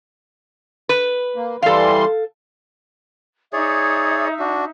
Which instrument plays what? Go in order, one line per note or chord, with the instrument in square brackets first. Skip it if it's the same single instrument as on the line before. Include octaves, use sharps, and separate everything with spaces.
[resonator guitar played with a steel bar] B4
[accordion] A#3
[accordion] E3 G3 C6 [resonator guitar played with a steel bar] A4 F5
[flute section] D#4 E5 [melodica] G#4 C#5 D5
[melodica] D4 F#4